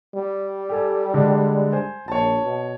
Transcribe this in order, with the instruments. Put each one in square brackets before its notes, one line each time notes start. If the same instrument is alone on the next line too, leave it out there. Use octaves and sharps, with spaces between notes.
[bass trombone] G3
[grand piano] G4 A4 G#5
D3 G#3
C5 G#5
[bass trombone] A#1 [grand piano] C#5 A5
[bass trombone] B2